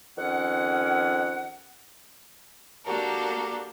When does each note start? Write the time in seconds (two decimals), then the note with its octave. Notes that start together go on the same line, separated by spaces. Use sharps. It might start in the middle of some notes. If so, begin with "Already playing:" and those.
0.18 F2 D#3 C#4 F#5
2.85 A#3 D4 F#4 G4 A4 A#4